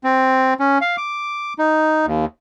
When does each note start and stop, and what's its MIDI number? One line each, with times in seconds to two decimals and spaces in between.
0.04 0.54 60
0.60 0.78 61
0.81 0.96 77
0.97 1.54 86
1.59 2.06 63
2.06 2.25 39